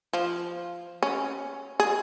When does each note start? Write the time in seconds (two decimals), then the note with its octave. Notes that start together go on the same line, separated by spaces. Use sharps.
0.13 F3
1.03 C#4
1.80 G#4